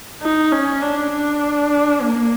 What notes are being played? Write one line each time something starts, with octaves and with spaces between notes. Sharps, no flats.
D#4
C#4
D4
D4
A#3